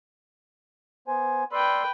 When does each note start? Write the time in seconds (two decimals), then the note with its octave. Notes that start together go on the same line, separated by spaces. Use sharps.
1.08 B3 C5 G#5
1.52 B4 D5 G5 C6 E6